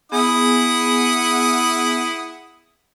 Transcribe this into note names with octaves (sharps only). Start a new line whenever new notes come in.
B3 E4 G#4 F#5 G#5 D#6